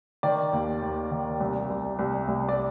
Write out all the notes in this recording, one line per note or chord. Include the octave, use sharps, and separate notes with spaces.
D#3 D5
D#2
D#2
D#3
C2
C2
C2
C2
D5